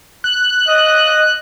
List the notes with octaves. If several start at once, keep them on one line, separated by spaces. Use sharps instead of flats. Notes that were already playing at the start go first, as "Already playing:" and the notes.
F#6
D#5